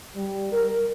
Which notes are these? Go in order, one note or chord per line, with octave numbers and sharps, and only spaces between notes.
G3
A#4